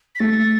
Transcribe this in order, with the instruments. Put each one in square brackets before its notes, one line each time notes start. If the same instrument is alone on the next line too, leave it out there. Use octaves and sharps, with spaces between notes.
[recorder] B6
[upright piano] A3 [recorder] A6